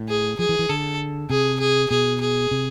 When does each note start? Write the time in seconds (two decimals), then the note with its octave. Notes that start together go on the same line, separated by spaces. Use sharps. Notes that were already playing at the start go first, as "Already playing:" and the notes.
Already playing: A2
0.08 G#4
0.39 F3 G#4
0.49 E3
0.59 E3
0.69 D3 A4
1.30 C3 G#4
1.60 G#4
1.90 B2 G#4
2.20 G#4
2.51 C3